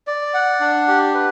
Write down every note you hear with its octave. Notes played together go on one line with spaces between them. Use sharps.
D5
F#5
D4
G4
B4